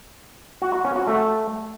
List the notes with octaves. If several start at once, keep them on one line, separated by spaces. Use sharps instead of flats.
F#4
F#4
C#4
F#4
A3